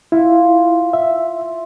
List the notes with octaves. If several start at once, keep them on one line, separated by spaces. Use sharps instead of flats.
E4 F4
E5